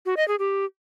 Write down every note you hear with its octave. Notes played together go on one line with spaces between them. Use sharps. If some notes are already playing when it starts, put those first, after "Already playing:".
F#4
D#5
G#4
G4